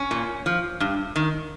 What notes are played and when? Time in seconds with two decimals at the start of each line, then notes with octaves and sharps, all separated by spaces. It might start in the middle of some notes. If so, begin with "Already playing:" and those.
Already playing: C#4
0.11 A#2
0.46 F3
0.80 G2
1.16 D#3